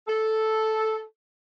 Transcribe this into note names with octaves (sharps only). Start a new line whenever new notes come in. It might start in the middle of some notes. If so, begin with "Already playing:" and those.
A4